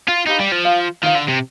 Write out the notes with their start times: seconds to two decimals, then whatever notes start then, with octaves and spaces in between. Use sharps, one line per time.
0.09 F4
0.27 D#4 G4 B4 F5 B5
0.40 G3
0.52 F3
0.65 F4 C5 F5
1.03 D#3 F4 C5 F5
1.15 D3
1.28 C3